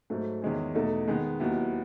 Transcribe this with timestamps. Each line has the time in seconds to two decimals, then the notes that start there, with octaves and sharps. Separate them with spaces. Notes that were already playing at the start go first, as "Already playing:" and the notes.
0.10 G#2 F#3 A3
0.42 E2 D#3 G#3 C#4
0.75 E2 B2 A3 D#4 A4
1.08 D#3 G#3 B3
1.40 D#2 D#3 F#3 B3 E4